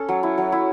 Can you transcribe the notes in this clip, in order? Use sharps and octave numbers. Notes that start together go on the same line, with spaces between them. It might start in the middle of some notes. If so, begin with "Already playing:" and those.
Already playing: C#4 A4
F#3
E4
F#3
E4